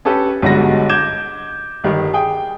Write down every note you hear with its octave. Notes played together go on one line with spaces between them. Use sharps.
C#4 G4 A4 B4
B1 G#2 D3 G3 F#4 A#6
D6 G6 G#6 E7
G1 D#3 G3
G#4 G5